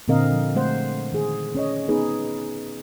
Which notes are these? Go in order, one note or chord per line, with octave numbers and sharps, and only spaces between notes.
A#2 D3 C4 A#4 D#5 F5
F3
G#3 A3 C5 F#5
D#3 G#4
C#4 C#5 D#5
B3 D#4 G#4 B4